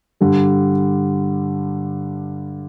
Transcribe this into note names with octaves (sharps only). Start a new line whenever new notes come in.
G2 D3 G3